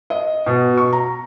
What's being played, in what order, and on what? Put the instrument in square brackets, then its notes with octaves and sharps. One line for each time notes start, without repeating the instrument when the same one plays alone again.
[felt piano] D#5
B2
C#6
A#5